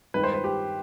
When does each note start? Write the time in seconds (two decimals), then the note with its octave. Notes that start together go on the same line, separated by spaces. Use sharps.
0.14 G2 D#3 G#3 B4
0.24 C5
0.33 B4
0.44 G4